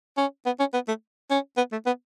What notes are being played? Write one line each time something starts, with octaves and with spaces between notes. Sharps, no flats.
C#4
B3
C#4
B3
A3
C#4
B3
A3
B3